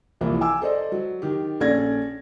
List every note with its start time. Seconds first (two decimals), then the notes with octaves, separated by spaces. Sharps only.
0.21 C2 E3 F3 A#3
0.41 G#5 D6 E6
0.62 A4 C5 D5 D#5
0.92 F#3
1.22 D#3 G4
1.60 A#1 C#4 A4 D5 G#6 A#6